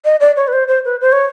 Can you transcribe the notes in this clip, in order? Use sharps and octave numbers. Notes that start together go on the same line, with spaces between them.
D#5
D5
C#5
B4
C5
C5
B4
C5
C#5